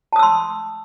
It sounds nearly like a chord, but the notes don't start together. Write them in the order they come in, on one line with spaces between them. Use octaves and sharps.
A5 D#6 E6 C6